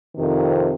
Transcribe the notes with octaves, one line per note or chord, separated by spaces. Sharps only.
F2 C3 D#3